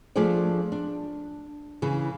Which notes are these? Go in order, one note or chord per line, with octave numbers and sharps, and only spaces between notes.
F3 A3 D4 G#4 C5 D5
D4
C#3 E3 G#4